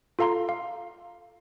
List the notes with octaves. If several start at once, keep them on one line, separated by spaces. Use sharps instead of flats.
F4 A4 F5 A#5 C6
F5